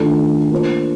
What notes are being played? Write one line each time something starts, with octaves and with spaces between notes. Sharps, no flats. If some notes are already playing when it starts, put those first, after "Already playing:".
Already playing: D#3 A3 D4 F4 A4
A#3 D4 F4 C5